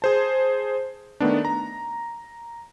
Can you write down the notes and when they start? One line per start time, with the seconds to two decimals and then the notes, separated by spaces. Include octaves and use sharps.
0.02 G#4 C5 A5
1.20 D#3 A3 B3 D4
1.45 A#5